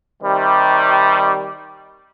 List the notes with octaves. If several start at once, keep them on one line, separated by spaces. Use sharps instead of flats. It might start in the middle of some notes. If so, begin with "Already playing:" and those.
C3 D#3 G3